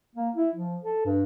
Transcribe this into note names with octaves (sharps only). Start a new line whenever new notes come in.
A#3
E4
F3
A4
G2